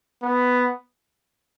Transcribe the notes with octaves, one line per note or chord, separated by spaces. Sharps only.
B3